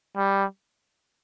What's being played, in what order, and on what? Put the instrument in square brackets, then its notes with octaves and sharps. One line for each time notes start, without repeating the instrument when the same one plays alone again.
[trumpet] G3